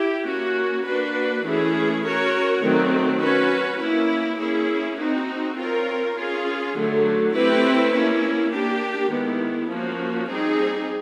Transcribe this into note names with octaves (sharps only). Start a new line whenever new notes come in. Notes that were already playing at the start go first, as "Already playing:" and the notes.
Already playing: E4 G4
A#3 C#4 F#4
A#3 D4 F#4 B4
E3 A3 C#4 E4 G#4
C#4 F#4 A#4 C#5
D#3 F#3 A3 C4
C#4 F#4 B4
A#3 C#4 E4
A#3 C#4 E4 G#4
C4 D#4 F#4
C4 F4 A#4 C#5
C#4 F4 G#4
D3 F#3 A3
A3 C4 E4 G4 B4
A#3 C#4 E4
A#3 D4 G4
D#3 G#3 B3 E4
F3 A#3 C#4 F#4
G3 C4 D#4 G#4